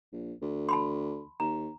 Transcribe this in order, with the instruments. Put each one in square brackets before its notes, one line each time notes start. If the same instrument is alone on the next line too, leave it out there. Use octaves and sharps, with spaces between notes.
[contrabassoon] A#1
D2
[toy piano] A5 B5 C6
[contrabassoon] D#2 [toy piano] A#5